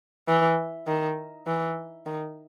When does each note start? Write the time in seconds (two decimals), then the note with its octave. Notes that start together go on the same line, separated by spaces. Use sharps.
0.28 E3
0.87 D#3
1.47 E3
2.06 D#3